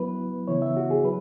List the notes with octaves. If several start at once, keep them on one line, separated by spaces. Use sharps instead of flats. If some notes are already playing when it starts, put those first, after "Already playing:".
Already playing: F#3 B3 E4 B4
C#3 E3 B3 E4 C#5
E5
F#4
G#4
F#3 B4